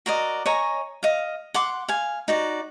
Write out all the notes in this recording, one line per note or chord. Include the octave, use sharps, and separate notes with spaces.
F#4 A#4 D5 D#5
C#5 D#5 G#5 A#5
D#5 F5
F#5 C6 D6
F5 G#5
D#4 F#4 D5